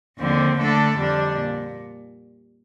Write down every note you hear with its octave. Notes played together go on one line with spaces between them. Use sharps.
D#2 D3 F3 C4
D3 A3 D4 A4
F2 D3 G3 D4
A#2